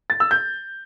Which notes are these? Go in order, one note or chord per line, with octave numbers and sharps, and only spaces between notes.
A6
E6
G6